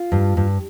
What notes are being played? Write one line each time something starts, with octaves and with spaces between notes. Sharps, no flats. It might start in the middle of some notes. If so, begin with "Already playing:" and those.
Already playing: F4
G2
G2